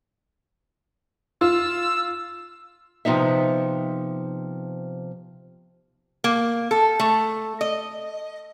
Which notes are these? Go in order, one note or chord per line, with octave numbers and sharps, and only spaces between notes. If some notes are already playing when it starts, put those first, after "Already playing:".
F4 E6
C3 F3 B3 D#4 E5
A#3
A4
A3
D#5